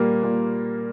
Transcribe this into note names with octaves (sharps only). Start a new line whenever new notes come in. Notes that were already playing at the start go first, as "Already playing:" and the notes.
Already playing: A#2 G3 A#3
A#2